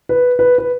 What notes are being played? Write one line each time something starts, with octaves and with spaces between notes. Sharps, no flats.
B4
B4
B4